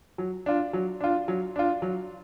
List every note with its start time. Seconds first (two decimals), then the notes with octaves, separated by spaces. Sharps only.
0.18 F#3
0.46 D4 F4
0.73 F#3
1.00 D4 F4
1.28 F#3
1.56 D4 F4
1.82 F#3